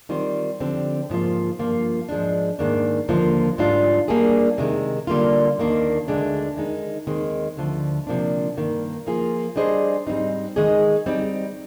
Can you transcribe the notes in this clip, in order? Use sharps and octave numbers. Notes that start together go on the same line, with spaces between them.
D#3 G3 C4 F4
D3 F3 C4 G4
G#2 F3 A#3 F4
G2 F3 A#3 F4
G#2 F3 G#3 D4
G#2 D#3 A#3 D4
D#2 D3 F3 A#3 F4
G#2 G3 D4 F4
G3 A#3 D4 G#4
C3 D#3 G#3
D3 G3 A#3 F4
D#2 D#3 A#3 D4
D2 D3 G#3 D4
D#3 G#3 D#4
D#2 D#3 G#3 C4
D2 D3 F3
C3 F3 A#3 D4
G2 D#3 A#3
F3 A#3 F4 G#4
G3 D4 G#4 C5 D#5
G#2 G3 C4 D#4
D#3 G#3 D#4 G#4 D#5
G3 C4 D#4